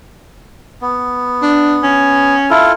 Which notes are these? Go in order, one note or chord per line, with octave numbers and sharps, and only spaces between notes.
B3
D4
C#4
E4 F4 A4